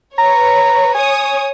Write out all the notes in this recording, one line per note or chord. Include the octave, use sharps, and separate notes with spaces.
B4 C#5 A#5
C#5 G#5 D#6